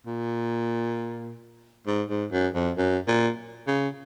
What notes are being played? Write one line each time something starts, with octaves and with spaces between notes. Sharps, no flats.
A#2
G#2
G#2
F#2
F2
F#2
A#2
C#3